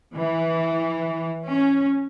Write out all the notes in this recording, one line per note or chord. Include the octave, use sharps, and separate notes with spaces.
E3
C#4